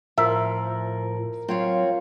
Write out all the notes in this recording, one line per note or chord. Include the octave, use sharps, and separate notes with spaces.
A2 F3 A#4 E5
F#3 C4 F4 C#5 F5